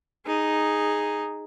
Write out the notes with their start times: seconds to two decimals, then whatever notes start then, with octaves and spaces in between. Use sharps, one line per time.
0.26 D#4 G#4